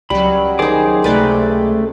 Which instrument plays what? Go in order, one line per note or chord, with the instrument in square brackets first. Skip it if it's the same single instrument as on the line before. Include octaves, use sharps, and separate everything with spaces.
[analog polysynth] C#2 F#3 [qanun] G3 [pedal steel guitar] B5
[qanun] D#3 D#4 [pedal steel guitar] G#4 C5 D6
[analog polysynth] C#2 C3 [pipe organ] A3 [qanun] B4 D5 G5